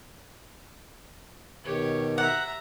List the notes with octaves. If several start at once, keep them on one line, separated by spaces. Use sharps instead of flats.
B2 D#3 G4 C#5
E5 F#5 A#5